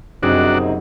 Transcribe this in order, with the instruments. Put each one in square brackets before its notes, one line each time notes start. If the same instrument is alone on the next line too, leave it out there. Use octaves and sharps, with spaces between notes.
[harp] F#1 [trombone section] F#2 C3 D#4 [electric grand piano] C4 G#4 [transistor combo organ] D4 F#4